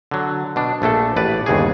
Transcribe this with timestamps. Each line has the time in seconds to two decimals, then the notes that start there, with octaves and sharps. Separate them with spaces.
0.11 D3 F#3
0.56 B2 D4
0.82 A#1 A3 D4 A4
1.16 A1 B4 D5
1.46 G1 D#2 C#3 G#4